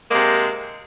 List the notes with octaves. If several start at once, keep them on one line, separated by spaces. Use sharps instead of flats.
C3 G#3 A#3